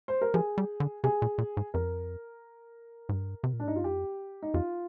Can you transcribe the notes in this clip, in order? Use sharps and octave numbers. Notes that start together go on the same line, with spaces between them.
C5
A#4
F3 G#4
G3
D3
C3 G#4
A#2
A#2
G#2
F2 A#4
G#2
G2
C3
A#2
D4
G#2 D#4
G2 F4
F2 G4
D#4
F2 F4